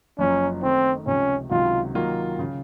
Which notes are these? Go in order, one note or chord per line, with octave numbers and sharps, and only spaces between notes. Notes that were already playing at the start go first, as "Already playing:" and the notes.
F#1 F#2 F3 C#4
D#3 A3 C4 D#4
C#2 C3 F3 C#4
C#2 C3 D#3 F#3 F4
D#3 F#3 A#3 F4
C#3